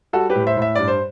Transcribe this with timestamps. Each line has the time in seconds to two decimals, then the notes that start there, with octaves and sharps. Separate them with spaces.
0.13 G3 F#4 A4
0.30 G4 B4
0.35 A2
0.47 C5 E5
0.57 A2
0.62 E5
0.75 G2 D5
0.88 C5